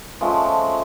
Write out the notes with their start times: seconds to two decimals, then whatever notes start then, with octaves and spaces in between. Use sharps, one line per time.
0.21 F3 G#3 A3 C#4